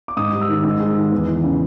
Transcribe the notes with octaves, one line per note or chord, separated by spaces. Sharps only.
D6
G#2 D#6
G3
E6
D#3
G#2 E6
G#3
D#3
E2
E3
C#3